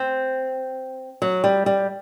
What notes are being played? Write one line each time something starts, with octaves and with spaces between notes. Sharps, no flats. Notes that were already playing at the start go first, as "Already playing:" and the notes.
Already playing: C4
F#3
G3
G3